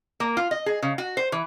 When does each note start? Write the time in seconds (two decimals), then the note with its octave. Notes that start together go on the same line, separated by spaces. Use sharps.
0.20 A#3
0.37 F4
0.51 D#5
0.66 G#4
0.82 C#3
0.98 F#4
1.17 C5
1.32 E3